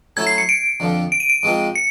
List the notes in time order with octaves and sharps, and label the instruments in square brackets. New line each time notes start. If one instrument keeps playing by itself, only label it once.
[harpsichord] F#3 A3 C#4 E4 A4 [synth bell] G#6
[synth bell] C7
C#7
D7
[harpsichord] F2 D3 F3
[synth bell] D7
D#7
D7
[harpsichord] G#2 F3 G#3 C4
[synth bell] C#7